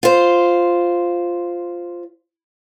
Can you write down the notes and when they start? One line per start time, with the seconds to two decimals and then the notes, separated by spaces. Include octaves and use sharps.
0.03 F4 C5